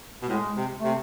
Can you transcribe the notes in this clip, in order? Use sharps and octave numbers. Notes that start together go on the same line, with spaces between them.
B2
A2 G#3
C3
C3 A3